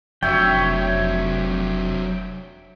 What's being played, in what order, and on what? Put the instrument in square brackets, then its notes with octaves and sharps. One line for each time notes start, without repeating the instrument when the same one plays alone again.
[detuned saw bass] F1 [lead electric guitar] F#3 D4 [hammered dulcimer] C#5 E5 [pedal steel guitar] G5